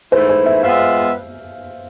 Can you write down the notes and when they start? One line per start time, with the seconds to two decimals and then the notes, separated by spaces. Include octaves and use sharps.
0.12 G#2 E3 A3 E4 C5
0.29 C5
0.46 E5
0.63 G#3 B3 F4 B4 E5 F5